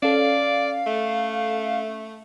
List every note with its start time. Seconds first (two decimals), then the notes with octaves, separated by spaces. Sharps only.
0.02 C#4 A4 D5 F5
0.86 A3